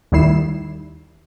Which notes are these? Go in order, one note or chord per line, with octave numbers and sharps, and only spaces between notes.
D#2 D#3 G3 E4 C7 E7